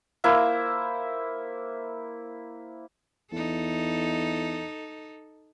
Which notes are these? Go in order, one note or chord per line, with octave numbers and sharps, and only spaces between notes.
A#3 E4 C5
E2 D#4 A4